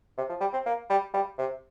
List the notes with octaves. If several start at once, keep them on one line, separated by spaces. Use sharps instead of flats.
C3
F3
G3
C4
A#3
G3
G3
C3